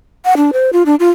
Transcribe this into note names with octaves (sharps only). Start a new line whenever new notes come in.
F#5
D4
C5
F4
D4
F4